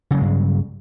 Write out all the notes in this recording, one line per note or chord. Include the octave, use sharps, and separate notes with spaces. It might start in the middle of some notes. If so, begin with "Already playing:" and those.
G2 C#3 F#3 G#3